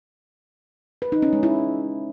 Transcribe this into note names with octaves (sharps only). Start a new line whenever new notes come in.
B4
D#4
C#4
G#3
E4